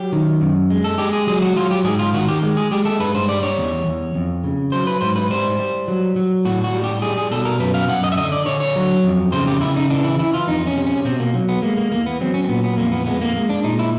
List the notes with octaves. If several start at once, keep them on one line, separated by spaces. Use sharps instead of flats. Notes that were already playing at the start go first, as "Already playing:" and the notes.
Already playing: F#3 G4
D#3
F#2
G#3
A4
G#3 G4
G#4
F#3 G#4
F#4
F#3 F4
G4
G#2 G#4
F4
D#3 F#4
G4
G#3
G#4
G#3 G4
A4
G2 B4
C5
G3 D5
C#5
E2
E2
F2
C#3
F#3 C5
B4
G#2 C5
B4
G3 C5
G3
F#3
F#3
A2 F#4
F#4
G3
G4
G3 G#4
G#4
B2 A4
A#4
F#2 B4
F5
F#2 F#5
D#5
E5
D3 D#5
D5
D3 C#5
C#5
F#3
F2
C#3 C5
G4
C#3 E4
D#4
E3 D4
E4
E3 E4
F4
F2 D#4
C#4
C3
C#4
B2 C4
A#3
F#3
B3
G#3 A#3
A#3
E2 A#3
B3
F#3 C4
C#4
C4
A#2 B3
B3
F2 A#3
B3
G#3 B3
A#3
G#3 A#3
D4
A#2 D#4
E4